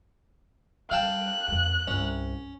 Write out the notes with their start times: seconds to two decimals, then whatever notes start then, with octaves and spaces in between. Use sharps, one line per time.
0.91 G3 F5 G5 A5 F#6
1.48 F2 G#3
1.88 C2 G2 C#4